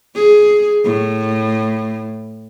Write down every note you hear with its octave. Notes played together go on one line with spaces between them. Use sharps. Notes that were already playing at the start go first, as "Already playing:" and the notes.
G#4
A2